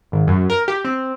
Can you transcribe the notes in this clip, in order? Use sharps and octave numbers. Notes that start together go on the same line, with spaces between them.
G#1
F#2
A#4
G4
C4